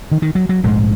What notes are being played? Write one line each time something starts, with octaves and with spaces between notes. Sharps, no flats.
D#3
D#3
F#3
F#3
A#1 G#2 G#3